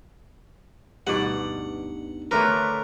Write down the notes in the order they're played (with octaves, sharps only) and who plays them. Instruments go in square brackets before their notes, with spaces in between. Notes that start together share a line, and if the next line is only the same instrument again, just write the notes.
[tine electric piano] D2 D#4 [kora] G2 B2 D5 [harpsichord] F#5
[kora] D3 A3 B4 [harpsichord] A#4 [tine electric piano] C#5 C6 D6